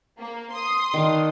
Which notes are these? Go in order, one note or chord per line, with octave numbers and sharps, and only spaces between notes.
A#3
C6 D#6
D#3 D4 F5